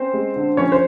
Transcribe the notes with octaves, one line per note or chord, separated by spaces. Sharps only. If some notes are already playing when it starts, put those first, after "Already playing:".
Already playing: C4 C#4 C5
G#3
D3
F3 C#4 C#5
C5